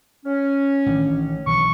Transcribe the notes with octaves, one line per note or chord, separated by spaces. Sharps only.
C#4
A1 D#3 D4
B1 E3 C#6